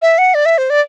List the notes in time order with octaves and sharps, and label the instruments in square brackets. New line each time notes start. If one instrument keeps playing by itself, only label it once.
[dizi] E5
F#5
D5
E5
C5
D5